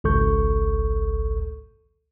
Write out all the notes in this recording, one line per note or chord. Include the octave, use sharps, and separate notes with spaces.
G#1 C#2 A4 C#6 G6